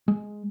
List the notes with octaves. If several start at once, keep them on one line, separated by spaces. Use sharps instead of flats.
G#3